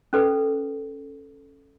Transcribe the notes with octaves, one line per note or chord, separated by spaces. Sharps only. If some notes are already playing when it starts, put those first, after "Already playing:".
C#4 A4 B4